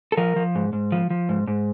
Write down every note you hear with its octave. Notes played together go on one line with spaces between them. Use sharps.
A4
F3 A#4
F3
G#2
G#2
F3
F3
G#2
G#2